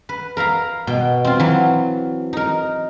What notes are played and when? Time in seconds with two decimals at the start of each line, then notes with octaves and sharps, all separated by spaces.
0.09 B4
0.37 A#4 E5 F5 A#5
0.87 B2 G5
1.25 C4 F4
1.40 E3 F#3
2.33 D#4 A#4